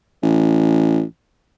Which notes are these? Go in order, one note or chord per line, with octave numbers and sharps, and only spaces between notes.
A1